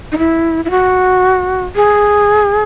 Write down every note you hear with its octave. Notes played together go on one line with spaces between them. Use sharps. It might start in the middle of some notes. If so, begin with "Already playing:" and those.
D#4
E4
E4
F#4
G#4